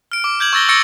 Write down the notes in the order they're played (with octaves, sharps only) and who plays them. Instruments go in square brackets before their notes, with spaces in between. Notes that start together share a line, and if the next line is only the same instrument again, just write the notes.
[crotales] F6 D7
D6
D6 G6 G#6 F#7
C#6 E6 A6 A#6 G7
C#6 E6 A6 A#6 C#7 D7